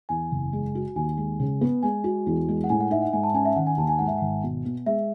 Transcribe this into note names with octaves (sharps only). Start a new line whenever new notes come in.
E2 G#5
F#1
G#3
F#4
D#2 G#5
G#3
C#3
B3
G#3 G#5
F#4
E2
G#3
F#5
A2 G#5
F#5
D#4 E5
F#5
G#2 G#5
A5
C#4 G#5
E5
D#3 F#5
G#5
D#2 A5
G#5
G#2 F#5
E5
G#1 F#5
B2
B3
G#3 E5